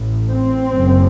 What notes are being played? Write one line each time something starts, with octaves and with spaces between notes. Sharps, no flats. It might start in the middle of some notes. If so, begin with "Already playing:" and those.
Already playing: A1 A2
C4
F#1 F#2